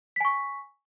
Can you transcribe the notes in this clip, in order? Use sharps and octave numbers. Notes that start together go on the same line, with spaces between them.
G#5 C#6 B6